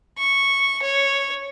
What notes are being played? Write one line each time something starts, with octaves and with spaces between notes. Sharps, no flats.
C#6
C#5